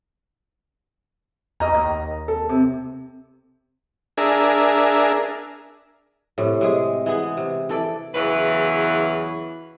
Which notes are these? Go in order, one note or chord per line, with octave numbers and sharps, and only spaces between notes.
E2 D#5 A#5
D#2
A4
C3
D4 G#4 A#4 E5
A2 C3
C3 G#3 G#4
E3 B3 G#4
C3
E3 A4 D5
E2 C#3 E3 F#3 B4